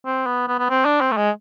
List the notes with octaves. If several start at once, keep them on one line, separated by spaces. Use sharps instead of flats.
C4
B3
B3
B3
C4
D4
C4
A3
G#3